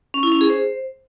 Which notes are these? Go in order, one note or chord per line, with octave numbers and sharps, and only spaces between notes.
C#4
E4
C#4
G#4
C5